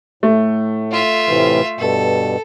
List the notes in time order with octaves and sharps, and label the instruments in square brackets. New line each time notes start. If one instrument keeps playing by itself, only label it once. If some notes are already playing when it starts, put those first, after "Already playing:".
[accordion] A2 [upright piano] A3
[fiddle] F4 E5
[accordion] A2 C3 E3
[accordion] G2 B2 [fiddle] A4